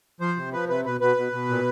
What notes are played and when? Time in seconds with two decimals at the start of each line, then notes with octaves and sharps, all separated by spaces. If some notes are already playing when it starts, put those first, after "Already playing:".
0.21 F3 C5
0.37 C3
0.52 F3 B4
0.68 C3 B4
0.85 B2 B4
1.01 B2 B4
1.17 B2
1.32 B2
1.48 A#2